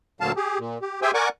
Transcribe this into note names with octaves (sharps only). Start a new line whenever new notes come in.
D2 A#2 D3 F#3 F5 A5
G4 G#4
A#2
G4
G4 G#4 C5 E5 G5 G#5
A#4 D5 F#5 G#5 C#6 D6